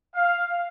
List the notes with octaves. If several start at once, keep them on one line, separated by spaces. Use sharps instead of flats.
F5